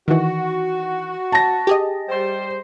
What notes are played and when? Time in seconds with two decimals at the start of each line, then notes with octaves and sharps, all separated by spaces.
0.08 D#3 E3 F#4
1.32 A5 A#6
1.67 G4 G#4 D#5
2.08 G3 C5